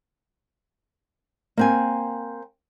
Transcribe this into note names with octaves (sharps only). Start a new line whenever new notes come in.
A#3 C4 G#5